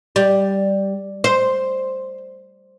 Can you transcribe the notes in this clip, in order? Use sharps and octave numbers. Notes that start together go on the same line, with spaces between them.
G3
C5